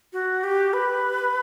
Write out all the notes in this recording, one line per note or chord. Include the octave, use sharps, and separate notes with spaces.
F#4
G4
B4